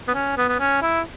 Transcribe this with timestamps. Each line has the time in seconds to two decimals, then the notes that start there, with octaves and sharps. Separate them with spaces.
0.08 B3
0.14 C#4
0.37 B3
0.49 B3
0.59 C#4
0.82 E4